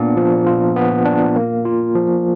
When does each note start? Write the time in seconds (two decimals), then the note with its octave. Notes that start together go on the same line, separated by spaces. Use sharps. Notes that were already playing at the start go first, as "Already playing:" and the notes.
Already playing: A#2 B3 D4
0.17 F3
0.46 F4
0.76 B3
1.05 D4
1.36 A#3
1.65 F4
1.95 F3